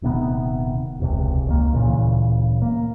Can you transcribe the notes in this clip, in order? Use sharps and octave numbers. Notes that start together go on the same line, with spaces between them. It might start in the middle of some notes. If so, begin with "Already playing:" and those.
D#1 C3 D#3 B3
E1 C#2 C3
C#2 D#3 A#3
D1 A#2 C#3 E3
A#3